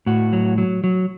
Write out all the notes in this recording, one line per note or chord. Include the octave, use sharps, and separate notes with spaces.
A2 F#4
F#3
F#3
F#3